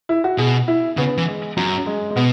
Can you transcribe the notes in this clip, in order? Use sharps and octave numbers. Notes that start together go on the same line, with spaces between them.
E4
F#4
B2 G#4
E4
C#3 B3
E3
G#3
F#2 F#3
G#3
G#3
B2 B3